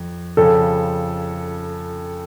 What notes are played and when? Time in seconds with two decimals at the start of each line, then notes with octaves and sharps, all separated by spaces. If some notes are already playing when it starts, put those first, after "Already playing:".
Already playing: F2
0.37 F2 C#3 F3 C#4 F4 A4